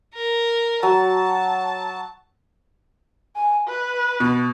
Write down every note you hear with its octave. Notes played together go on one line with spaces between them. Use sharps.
A#4
F#3 A5
G#5
B4
B2